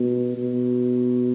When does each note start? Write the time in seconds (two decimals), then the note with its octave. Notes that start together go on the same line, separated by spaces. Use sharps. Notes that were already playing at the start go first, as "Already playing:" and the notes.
Already playing: B2
0.37 B2